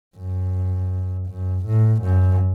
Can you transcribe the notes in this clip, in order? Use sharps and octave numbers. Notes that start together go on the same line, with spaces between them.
F#2
F#2
A2
F#2